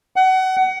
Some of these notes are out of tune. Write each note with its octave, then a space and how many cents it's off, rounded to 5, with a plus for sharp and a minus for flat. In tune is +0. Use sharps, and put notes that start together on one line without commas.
F#5 +25